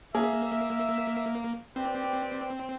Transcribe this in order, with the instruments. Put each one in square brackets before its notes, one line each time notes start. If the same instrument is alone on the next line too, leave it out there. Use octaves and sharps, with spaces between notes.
[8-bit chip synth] A#3 [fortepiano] G#4 [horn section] E5
[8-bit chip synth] C4 [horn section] G4 B4 D5